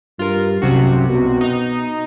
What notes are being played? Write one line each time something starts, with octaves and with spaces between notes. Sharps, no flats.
G2 F4 A#4
C2 F#2 C3 F#4
B2
D#4